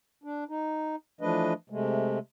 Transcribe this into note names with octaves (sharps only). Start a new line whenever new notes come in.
D4
D#4
E3 F3 A3 D4 B4 D#5
C3 G#3 A3